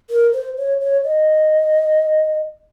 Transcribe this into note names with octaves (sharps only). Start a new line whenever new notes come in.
A#4
C5
C#5
C#5
D#5